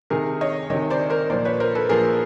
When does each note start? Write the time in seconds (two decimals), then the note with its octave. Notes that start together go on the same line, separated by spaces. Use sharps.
0.10 C3 D#3 G#4 A#4
0.41 C#5 D#5
0.70 C3 D#3 C#5 D#5
0.90 C5 D5
1.10 A#4 C5
1.30 A#2 F3 C5 D5
1.45 B4 C#5
1.60 A#4 C5
1.75 A4 B4
1.89 A#2 F3 G#4 A#4